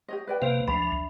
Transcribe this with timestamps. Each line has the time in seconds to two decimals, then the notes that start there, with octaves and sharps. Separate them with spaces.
0.08 G4 C#5 D#5
0.27 B4 D5 G5
0.42 C3 A#3 B4 C5 F5
0.68 D2 F3 D4 E5 B5